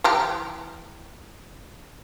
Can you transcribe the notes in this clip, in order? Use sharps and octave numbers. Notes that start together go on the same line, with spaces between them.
E3 G4 A#5